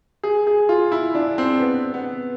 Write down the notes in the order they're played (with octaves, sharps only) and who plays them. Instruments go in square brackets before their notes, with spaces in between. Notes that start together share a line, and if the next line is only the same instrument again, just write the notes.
[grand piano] G#4
G#4
F4
E4
D4
C4
B3
B3